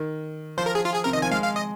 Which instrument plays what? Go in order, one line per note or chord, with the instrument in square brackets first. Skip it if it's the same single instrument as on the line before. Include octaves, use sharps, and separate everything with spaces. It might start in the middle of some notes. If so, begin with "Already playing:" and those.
Already playing: [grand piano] D#3
[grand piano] F3 [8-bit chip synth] C5
[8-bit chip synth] A#4
G#4
F4
G#4
[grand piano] C3 [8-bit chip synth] A#4
[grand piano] D#3 [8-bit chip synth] D#5
[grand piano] F3 [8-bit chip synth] G#5
[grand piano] G#3 [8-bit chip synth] F5
[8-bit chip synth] F5
D#5